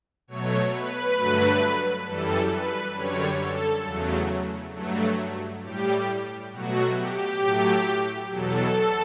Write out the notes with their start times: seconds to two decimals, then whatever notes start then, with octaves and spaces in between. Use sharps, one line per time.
0.28 B2 F#3 A3 C#5
0.72 B4
1.17 G2 D3 F#3 A3
2.06 F#2 E3 G3 A4
2.50 B4
2.95 F#2 D3 G3 C#5
3.40 A4
3.84 E2 C#3 F#3 A3
4.73 G2 F#3 A3
5.63 A2 G3 G4
6.52 B2 F#3 A3 F#4
6.96 G4
7.41 A2 F#3 A3
8.31 E2 B2 F#3 A4